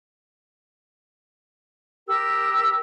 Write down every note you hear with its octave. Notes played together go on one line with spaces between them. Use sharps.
G4 A#4 E6